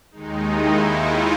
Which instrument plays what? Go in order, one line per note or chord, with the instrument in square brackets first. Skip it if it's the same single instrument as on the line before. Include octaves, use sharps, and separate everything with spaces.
[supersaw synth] D#2 D#3 G#3 D#4
E4
F4